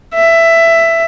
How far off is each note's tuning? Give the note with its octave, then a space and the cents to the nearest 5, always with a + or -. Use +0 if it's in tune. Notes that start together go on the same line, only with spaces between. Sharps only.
E5 +10